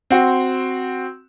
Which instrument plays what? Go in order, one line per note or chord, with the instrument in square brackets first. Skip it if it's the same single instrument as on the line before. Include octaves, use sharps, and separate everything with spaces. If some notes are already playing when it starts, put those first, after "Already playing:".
[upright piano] C4 F#4